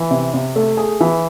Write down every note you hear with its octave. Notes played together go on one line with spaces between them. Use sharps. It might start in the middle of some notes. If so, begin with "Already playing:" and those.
Already playing: E3
C3
C3
A3
G#4
E3